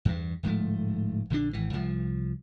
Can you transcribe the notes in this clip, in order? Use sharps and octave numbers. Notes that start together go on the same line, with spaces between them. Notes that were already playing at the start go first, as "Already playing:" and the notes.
E2 G2
D1 G#2 F3 A3
A#1 D3 E3 D4
G#1 E3
C2 F3